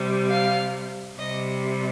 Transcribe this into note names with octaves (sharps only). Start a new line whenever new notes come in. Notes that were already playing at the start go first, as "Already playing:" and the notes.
Already playing: C3 G3
F5
C3 G3 D#5